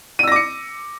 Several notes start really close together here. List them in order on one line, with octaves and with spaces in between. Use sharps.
D#7 E6 A#6 D6 C#7